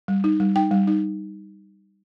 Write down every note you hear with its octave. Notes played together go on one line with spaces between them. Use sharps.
G3
D#4
G3
D#4 G5
G3
D#4